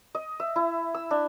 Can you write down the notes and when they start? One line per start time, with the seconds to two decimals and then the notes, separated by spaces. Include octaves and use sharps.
0.15 D#5
0.40 E5
0.56 E4
0.94 E6
1.11 D4